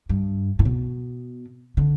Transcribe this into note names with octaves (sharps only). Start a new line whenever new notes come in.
G2
A2
B2
D3